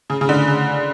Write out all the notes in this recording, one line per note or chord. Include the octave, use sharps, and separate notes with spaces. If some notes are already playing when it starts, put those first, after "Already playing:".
C#3
C#3
D3
C#3